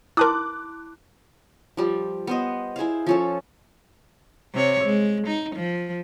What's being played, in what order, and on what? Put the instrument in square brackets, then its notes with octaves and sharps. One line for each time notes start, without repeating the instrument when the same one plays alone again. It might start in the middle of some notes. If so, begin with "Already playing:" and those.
[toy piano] E4 A5 C6 [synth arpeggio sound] A#4 D#6 [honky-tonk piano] D6 F#6
[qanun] F3 G3
B3 C5 D#5
E4 G#4 C5 F5
F3 C#4 A4
[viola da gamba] C3 C#5
G#3
D#4
F3